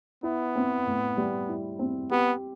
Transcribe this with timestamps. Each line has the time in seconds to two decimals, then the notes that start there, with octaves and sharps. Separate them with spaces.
0.23 B3 E4
0.55 C4
0.86 A2
1.17 G3
1.49 E4
1.79 C4
2.11 B3 G4